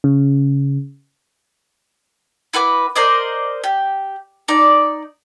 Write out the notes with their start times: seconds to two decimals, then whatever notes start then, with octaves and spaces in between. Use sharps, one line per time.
0.04 C#3
2.53 E4 F#4 B4 D6
2.96 A#4 C5 D5 D#5
3.64 G4
4.48 D#4 D5